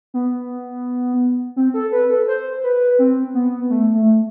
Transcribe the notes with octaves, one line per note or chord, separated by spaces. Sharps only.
B3
C4
A4
B4
A4
C5
B4
C4
B3
A3
A3